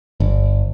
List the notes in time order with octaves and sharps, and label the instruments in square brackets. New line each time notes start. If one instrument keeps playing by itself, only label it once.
[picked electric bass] G1